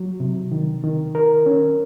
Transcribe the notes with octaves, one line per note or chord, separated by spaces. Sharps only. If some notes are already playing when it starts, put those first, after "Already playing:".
Already playing: F#3
C3
D#3
D#3
A#4
C#4